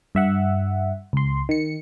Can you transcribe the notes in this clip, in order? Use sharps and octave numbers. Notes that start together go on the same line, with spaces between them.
G2 E5 F#5
C#2 C6
D#3 C#7